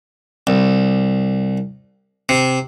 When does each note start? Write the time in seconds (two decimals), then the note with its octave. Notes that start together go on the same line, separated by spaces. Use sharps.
0.47 C2
2.29 C3